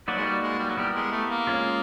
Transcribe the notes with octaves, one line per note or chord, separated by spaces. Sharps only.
F#3 A#3 D#4 F#4 B4 D5
G#3
G3
G#3
G3
F#3
G3 B3 E4 G4 A#4
G#3
A3
A#3
G#3 C#4 F4